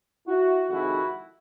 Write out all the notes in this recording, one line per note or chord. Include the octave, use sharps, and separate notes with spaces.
E4 F#4
F2 C3 D#3 G#3 E4 F#4